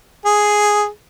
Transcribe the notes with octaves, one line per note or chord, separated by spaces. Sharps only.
G#4